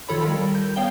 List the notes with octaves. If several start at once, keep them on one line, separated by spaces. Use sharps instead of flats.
D#3 F4 A4 C#5 B5
G3 A#4
G6
B3 C#5 F5 G5 G7